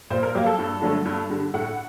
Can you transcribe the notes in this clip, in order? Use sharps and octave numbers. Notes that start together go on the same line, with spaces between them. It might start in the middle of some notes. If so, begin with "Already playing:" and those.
A#2 C5
A#4
F#3 A#3 G4
A4
G2
D3 F#3 A3
G2
D3 G3
A2 F#5